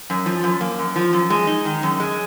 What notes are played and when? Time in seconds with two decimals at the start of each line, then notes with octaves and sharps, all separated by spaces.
0.10 F#2
0.26 F3
0.44 F#2
0.61 A#3
0.79 F#2
0.96 F3
1.13 F#2
1.30 G#3
1.47 D#4
1.65 D#3
1.83 F#2
2.00 G#3